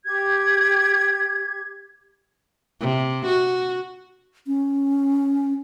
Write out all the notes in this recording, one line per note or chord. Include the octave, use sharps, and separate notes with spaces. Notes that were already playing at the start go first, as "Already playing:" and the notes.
G4 G#6
C3
F#4
C#4